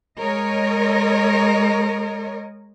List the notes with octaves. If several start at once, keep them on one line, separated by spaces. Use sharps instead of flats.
G#3 A#4 C#5 D#5